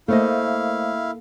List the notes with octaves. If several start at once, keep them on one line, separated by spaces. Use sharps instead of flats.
A3 A#3 E4 A4 C5 D#5 F5